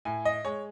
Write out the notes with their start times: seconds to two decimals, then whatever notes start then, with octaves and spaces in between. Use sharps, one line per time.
0.05 A2 G#5
0.25 D#5
0.45 G#3 C#5